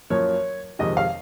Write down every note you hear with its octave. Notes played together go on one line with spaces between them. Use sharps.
F#2 F3 A#3 C#5
F2 C3 D#3 G#3 D#5
F5